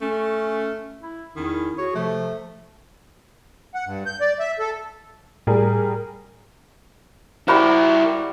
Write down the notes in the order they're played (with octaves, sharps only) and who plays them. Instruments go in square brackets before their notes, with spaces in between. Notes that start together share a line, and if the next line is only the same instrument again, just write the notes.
[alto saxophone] A3 [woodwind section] C#4
[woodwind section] E4
[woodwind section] E2 C#4 E4 [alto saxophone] D#3
[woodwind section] F#4 G#4 [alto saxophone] C#5
[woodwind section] C3 F3 [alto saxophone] A3
[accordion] F#5
G2
G6
D5
E5
A4
[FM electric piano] A2 [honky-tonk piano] G3 G#4 A#4
[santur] G3 F#4 [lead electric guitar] E4 A#4 [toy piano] C5 B5